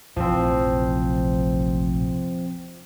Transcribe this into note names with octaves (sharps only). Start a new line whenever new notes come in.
F1 A#1 E3 F3 C4